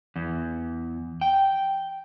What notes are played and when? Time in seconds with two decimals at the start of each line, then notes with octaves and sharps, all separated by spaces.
0.16 E2
1.21 G5